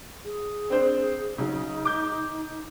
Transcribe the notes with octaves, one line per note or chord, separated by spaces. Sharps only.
G#4
C4 D4 C5
C#3 F#3 D#4
D6 G6